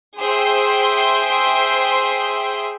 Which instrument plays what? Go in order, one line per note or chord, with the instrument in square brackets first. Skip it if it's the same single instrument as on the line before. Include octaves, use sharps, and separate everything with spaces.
[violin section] G#4 C5 E5 G5 C6